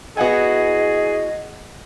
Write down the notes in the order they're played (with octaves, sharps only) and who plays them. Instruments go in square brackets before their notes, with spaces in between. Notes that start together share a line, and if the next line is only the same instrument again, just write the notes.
[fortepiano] B3 F#5 G#5 [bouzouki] E4 F#4 [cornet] G#4 [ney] D#5